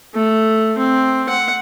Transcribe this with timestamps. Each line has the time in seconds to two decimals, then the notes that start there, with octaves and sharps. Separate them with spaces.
0.14 A3
0.78 C4
1.29 F#5